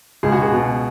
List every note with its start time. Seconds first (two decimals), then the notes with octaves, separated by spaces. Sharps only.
0.23 C#2 G#4
0.32 F#4
0.42 G#4
0.51 B2